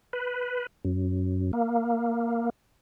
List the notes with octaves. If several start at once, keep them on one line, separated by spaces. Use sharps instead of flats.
B4
F#2
A#3